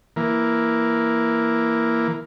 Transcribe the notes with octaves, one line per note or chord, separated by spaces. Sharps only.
E3 A#3